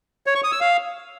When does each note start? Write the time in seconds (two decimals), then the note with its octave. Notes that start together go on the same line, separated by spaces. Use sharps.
0.26 C#5
0.35 C#6
0.44 D#6
0.52 E6
0.61 F5